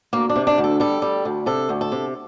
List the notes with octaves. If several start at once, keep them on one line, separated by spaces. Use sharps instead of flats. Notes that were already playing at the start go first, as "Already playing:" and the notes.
D2 A#3
D4
C3
D4
D2
A4
G3 A4
G3
D2
C3 A4
D2
A4
C3